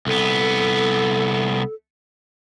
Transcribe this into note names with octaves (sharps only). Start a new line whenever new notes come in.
C2 B3 A4